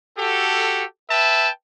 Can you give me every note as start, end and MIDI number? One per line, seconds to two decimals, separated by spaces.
0.18 0.84 66
0.18 0.84 67
0.18 0.84 69
1.10 1.49 71
1.10 1.49 76
1.10 1.49 79
1.10 1.49 81